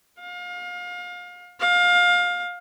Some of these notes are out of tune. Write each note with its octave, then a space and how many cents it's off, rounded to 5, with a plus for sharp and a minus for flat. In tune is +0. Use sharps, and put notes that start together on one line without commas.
F5 +35
F5 +25